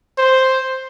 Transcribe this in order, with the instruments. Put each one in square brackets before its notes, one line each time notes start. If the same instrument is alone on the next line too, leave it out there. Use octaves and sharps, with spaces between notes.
[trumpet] C5